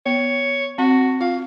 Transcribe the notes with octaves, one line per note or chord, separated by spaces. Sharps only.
B3 C#5
C4 F#4
F4 F5